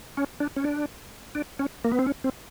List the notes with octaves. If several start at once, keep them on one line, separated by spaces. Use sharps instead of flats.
C#4
D4
C#4
D4
D4
C#4
A#3
B3
C4
C#4
C4